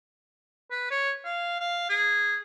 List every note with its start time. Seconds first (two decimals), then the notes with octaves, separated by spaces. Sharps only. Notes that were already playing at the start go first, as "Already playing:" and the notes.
0.71 B4
0.90 C#5
1.25 F5
1.60 F5
1.89 G#4